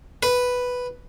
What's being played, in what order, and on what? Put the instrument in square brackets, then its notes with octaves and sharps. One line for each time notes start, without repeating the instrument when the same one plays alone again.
[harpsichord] B4